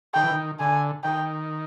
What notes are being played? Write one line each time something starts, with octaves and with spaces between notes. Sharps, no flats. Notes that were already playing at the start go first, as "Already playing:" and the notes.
D#3 G5
E3
D#3
D3 G#5
D#3 G5